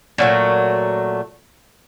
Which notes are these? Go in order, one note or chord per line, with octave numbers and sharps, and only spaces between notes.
A#2 F#3 A3